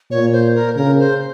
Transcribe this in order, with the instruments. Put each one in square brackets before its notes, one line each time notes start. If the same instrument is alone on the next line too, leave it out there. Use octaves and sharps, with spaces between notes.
[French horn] A#2 [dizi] C#5
[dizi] C5
A#4
[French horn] C#3 [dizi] A#4
[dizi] C5